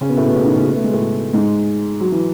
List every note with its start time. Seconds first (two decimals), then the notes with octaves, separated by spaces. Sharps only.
0.01 C#3 C#4
0.09 B2 B3
0.17 A2 A3
0.25 B2 B3
0.35 C#3 C#4
0.45 D#3 D#4
0.56 C#3 C#4
0.68 B3
0.76 A3
0.84 G#3
0.93 A2 A3
1.33 G#2 G#3
2.00 F#3
2.12 E3